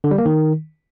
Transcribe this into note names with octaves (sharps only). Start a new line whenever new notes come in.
D3
G3
A#3
D#3